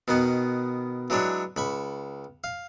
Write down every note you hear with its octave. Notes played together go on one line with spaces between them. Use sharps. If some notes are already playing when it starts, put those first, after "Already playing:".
B2 D#3 B3
E3 F#3 G#3 D4 C#5
C#2 B5 C#6
F5